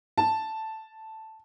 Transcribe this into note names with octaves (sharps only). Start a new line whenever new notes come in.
A5